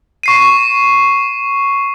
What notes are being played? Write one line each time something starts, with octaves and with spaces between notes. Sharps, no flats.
C#6 C7 D#7